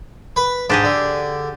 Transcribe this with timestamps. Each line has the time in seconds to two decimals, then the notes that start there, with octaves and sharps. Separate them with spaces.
0.36 B4
0.70 G#2 D4 G4 G#4
0.84 D3